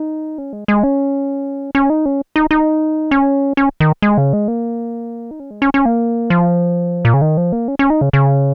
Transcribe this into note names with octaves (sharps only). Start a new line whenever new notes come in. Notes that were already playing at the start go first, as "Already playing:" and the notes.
Already playing: D#4
C#4
G#3
G#3
C#4
C#4
D#4
C#4
D#4
D#4
C#4
C#4
D#3
G#3
C#3
G#3
A#3
D#4
C#4
G#3
C#4
C#4
A#3
F3
A#2
C#3
D#3
F3
A#3
C#4
C#4
D#4
C#3
C#3